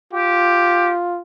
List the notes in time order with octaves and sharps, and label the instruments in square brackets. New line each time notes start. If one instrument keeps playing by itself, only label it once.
[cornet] F4 [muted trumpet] G4